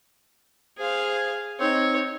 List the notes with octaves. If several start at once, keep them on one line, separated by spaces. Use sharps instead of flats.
G#4 C5 F5
C4 D#4 C#5